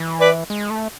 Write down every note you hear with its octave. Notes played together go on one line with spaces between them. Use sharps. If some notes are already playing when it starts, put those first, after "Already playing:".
Already playing: E3
B4 D5
G#3
A3